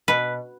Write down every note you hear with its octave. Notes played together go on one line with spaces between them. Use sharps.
B2 B4